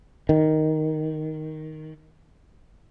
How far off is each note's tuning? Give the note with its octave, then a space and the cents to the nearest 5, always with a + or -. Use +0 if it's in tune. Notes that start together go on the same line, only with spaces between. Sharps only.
D#3 +5